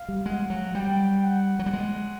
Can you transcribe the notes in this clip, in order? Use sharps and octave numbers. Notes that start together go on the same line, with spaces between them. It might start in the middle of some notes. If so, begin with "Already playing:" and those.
Already playing: F5
G3
G#3 F#5
F#3
G3 G5
F#5
F#3
G3
G#3